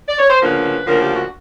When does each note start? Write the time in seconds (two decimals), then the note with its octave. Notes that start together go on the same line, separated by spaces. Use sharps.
0.08 D5
0.19 C#5
0.30 C5
0.42 D2 C#3 F3 A#3 D4 B4
0.85 D2 C#3 F3 A#3 D4 A#4
1.00 G4
1.15 F#4